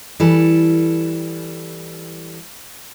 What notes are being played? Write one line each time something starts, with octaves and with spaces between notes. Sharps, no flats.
E3 G3 A4